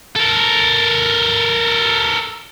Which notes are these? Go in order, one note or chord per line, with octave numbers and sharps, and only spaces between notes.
A4 A#4